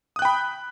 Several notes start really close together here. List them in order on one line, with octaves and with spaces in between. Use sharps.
D#6 F#6 G5 B5